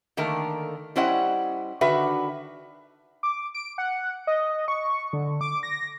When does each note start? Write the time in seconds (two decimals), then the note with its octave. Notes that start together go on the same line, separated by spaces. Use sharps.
0.17 D3 D#3 A3 A#3 A#4
0.96 G3 C#4 E4 C5 D#5 F#5
1.81 D3 D#3 F#4 B4 E5
3.23 D6
3.55 D7
3.78 F#5
4.27 D#5
4.68 C#6
5.13 D3
5.41 D6
5.63 A#6